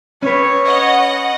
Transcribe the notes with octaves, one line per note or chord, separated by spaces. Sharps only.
C#4 B4 C#5
D#5 F#5